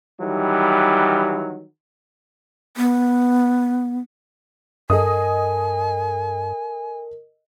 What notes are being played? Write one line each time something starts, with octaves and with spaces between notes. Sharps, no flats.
D#3 E3 F#3 G3
B3
G2 A4 A#4 D#5 G#5 D#6